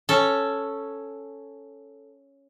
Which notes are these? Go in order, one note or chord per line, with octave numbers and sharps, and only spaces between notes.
C#4 A4